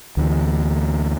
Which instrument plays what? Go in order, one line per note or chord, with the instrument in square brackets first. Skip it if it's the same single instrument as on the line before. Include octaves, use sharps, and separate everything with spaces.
[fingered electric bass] D2 E3